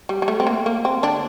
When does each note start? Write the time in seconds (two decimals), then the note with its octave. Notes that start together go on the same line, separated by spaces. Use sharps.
0.09 G3
0.22 G3
0.28 A3
0.40 C4
0.47 A#3
0.66 A#3
0.85 C4
1.03 D3 D4